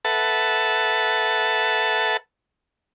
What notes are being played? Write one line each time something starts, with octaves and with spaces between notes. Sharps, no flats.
A4 B4 E5 F#5 A5